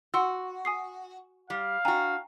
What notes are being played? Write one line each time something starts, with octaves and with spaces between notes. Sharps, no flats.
F#4 F#5 C6 E6
G#5 D#6 C7
G3 F5
D4 F#4 G5 G#5 A#5